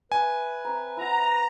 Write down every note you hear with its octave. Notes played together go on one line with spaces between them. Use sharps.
B4 E5 G#5
C4 E5 A#5
E4 F#5 A#5